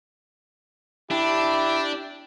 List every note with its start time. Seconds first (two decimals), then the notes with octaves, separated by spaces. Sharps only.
1.11 D4 E4 G4